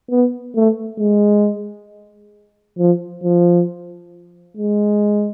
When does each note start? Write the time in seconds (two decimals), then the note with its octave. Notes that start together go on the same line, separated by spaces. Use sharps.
0.11 B3
0.55 A3
0.99 G#3
2.78 F3
3.23 F3
4.57 G#3